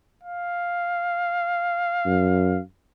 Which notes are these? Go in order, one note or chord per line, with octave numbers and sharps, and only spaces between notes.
F5
F#2